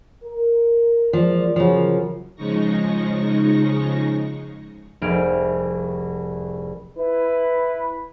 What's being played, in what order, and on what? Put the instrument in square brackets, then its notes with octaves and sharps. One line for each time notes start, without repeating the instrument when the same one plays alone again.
[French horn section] A#4
[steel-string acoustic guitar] F3 [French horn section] G#3 A#3 D5
[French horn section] F#2 F#3 [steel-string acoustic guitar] C#3 F3
[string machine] C#3 F3 G#3 D#4 C#6 A#6
[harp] F1 C2 G#4 G5 F6 D7
[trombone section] E4 B4